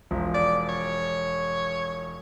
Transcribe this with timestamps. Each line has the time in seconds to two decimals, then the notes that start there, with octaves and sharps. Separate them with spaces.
0.11 E1 F3
0.34 D5
0.69 C#5